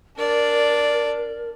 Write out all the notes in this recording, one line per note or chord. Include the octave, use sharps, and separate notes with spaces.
D4 A#4 D5